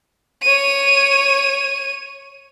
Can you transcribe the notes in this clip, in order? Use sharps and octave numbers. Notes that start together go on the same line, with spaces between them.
C#5 D#7